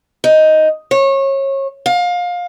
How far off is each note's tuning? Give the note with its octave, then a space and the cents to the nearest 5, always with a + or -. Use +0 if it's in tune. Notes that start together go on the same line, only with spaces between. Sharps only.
D#4 +5
C#5 -25
F5 +25